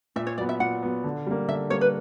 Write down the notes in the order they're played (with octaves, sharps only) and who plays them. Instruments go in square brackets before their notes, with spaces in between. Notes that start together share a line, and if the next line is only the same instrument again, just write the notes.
[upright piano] A#2 [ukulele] E5
[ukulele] C#5
[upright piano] F#3 [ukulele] D5
[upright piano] B3
[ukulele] E5
[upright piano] A#2 [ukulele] F#5
[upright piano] F#3 B3
D3
G3 A#3
[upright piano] D3 [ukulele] E5
[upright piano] G3 A#3 [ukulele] C#5
[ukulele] B4